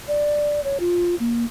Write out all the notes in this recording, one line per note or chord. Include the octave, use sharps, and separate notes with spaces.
D5
C#5
F4
A#3